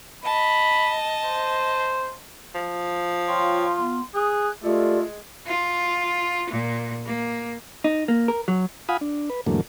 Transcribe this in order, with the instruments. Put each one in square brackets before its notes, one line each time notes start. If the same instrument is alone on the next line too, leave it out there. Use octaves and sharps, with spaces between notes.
[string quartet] D#5 A5 [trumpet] B5
[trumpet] C5
[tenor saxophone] F3
[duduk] F4 [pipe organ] C#5 G5 C#6 [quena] C6
[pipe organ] B3
[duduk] G#4 [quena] D#6 [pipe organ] F#6
[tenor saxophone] G#3 [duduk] A3 [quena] F4 [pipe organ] G4 A4 D5
[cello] F4
A#2
A#3
[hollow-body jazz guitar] D#4
A#3
A#4
F#3
[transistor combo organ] F4 F5 F#5 G#5 B5 D#6
D4
B4
E2 G#2 D3 F#3 A3 A#3